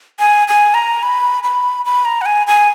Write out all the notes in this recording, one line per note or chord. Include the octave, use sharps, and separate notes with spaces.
G#5
G#5
A#5
B5
B5
B5
A#5
F#5
G#5
G#5